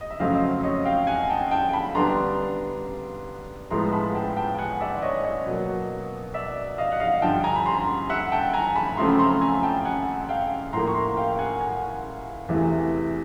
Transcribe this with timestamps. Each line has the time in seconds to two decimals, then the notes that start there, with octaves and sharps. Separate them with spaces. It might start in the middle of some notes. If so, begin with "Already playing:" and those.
0.01 D#5
0.10 E5
0.20 F2 C#3 F#3 A3 C4 D#5 F5
0.63 C#5 D#5
0.85 F5 G5
1.07 F#5 G#5
1.29 G5 A5
1.51 G5 A5
1.73 A5 B5
1.95 D3 G3 B3 D4 A#5 C6
3.70 A2 F3 G#3 B3 A#5 C6
3.93 A5 B5
4.15 G5 A5
4.37 G5 A5
4.58 F#5 G#5
4.81 D5 E5
5.02 C#5 D#5
5.24 C#5 D#5
5.46 B2 F#3 A#3
6.34 D5 E5
6.78 D#5 F5
6.92 F#5
7.00 D#5 F5
7.22 G2 D3 F3 G5 A5
7.44 G#5 A#5
7.56 B5
7.66 A#5 C6
8.09 E5 F#5
8.32 G5 A5
8.53 G#5 A#5
8.76 A5 B5
8.97 F#2 C#3 F3 A3 C4 A#5 C6
9.09 B5
9.19 A#5 C6
9.41 G#5 A#5
9.63 G5 A5
9.85 F#5 G#5
10.29 F5 G5
10.73 A2 F3 A#3 A#5 C6
10.87 C#6
10.95 A#5 C6
11.17 F5 G5
11.39 F#5 G#5
11.60 F#5 G#5
12.48 E2 C3 E3 A3